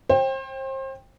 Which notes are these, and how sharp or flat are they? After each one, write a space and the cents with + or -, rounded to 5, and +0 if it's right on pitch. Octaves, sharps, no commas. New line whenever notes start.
C5 +35 G5 +10